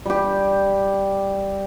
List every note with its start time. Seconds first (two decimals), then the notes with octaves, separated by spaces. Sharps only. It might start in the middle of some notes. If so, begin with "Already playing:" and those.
0.06 G3 G4